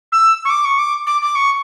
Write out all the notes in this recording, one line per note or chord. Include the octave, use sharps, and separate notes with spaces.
E6
C#6
D6
C#6
D6
D6
D6
C#6